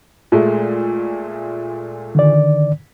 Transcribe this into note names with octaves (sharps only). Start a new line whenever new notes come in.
A#2 G#3 A3
D3 D#3 D5